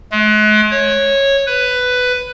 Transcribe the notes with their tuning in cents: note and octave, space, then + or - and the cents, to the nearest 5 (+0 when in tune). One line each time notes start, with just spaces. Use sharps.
G#3 +40
C#5 -10
B4 +10